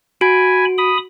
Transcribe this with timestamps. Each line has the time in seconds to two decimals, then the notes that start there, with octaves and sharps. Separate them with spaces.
0.21 F#4 G#5 B5 D7
0.78 B5 D#6